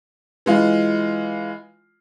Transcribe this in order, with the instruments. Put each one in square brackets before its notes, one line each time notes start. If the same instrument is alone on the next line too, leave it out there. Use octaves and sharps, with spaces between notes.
[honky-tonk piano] E3 G#3 F4